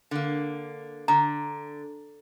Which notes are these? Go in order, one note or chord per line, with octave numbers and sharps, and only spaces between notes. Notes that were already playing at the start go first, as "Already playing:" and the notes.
D3 A#3
D3 A#5